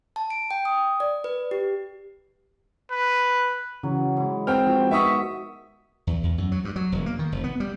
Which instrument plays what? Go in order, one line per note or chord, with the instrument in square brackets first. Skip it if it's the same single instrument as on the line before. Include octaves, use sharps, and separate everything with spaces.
[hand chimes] A5
D7
G5
D#6
D5
B4
G4
[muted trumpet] B4
[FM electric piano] C#3 E3 [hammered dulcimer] F#3
[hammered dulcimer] G#2 E4
[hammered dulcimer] D#3 [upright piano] C4 G5 [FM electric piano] F6
[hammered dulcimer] B2 [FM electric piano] F3
[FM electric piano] B3 D#4 B6 [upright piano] E5 C#6 D#6
[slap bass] E2
E2
F#2
F#3
G2
F#3
E1
A#3
D#3
F1
B3
G3